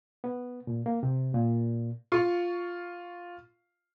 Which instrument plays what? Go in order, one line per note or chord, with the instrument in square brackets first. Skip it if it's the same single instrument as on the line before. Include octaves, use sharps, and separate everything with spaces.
[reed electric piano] B3
A#2
A#3
C3
A#2
[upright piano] F4 F5 C#6